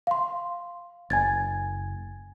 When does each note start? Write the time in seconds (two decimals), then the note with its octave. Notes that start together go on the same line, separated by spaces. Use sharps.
0.07 F5 C6
1.10 F#1 G#5 G#6 A6